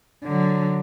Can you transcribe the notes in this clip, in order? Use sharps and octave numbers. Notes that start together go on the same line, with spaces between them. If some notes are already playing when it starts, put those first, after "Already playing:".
D3 F#3